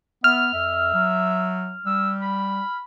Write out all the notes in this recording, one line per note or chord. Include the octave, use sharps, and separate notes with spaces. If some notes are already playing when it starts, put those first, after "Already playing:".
B3 E5 F6
F2 E5
F#3
G3 E6
B5